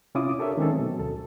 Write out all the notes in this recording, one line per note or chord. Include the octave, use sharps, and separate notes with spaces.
C3 C#4 E4 F4 D6 D#6
D4 G4 A4 A#4 C#5 E5
D#3 G#3 C4 C#4 G#4 A4
B2 F#3
D2 A4